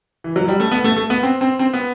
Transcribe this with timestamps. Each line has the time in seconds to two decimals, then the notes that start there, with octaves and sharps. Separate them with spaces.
0.24 E3
0.36 F#3
0.48 G3
0.60 A3
0.71 B3
0.84 A3
0.96 A3
1.10 B3
1.23 C4
1.41 C4
1.59 C4
1.73 B3